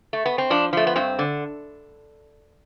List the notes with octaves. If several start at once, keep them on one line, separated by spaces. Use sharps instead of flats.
A3
B3
C4
F3 D4
F3 A3
B3
G2 C4
D3